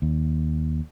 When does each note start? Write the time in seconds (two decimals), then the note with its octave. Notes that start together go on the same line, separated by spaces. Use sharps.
0.02 D#2